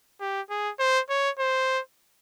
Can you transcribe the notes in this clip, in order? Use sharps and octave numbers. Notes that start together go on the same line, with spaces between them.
G4
G#4
C5
C#5
C5